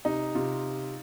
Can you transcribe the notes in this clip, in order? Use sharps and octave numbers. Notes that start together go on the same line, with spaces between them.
C3 D#4
C3 F4